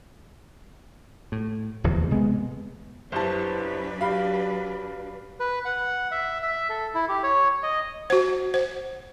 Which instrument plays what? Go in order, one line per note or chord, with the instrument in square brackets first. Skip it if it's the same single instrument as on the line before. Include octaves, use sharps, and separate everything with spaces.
[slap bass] A2
D1 E2 C3 F3
C3 G#3 A3 B3
[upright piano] F#1 A5 [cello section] F#3 D4 B4 [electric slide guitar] E4 G4 C5
[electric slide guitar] F#4 G4 [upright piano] F5 B5
[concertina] B4
F#5
E5
E5
A4
E4
G4
C#5
D#5
[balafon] F#4 C5
C5